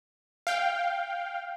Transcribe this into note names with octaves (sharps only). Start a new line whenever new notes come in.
F5 G5